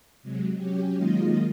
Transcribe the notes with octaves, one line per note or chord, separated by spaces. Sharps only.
C3 F#3 G#3
F#3 C#4 G4
D#3 F#3 G#3 A#3 F4 D#5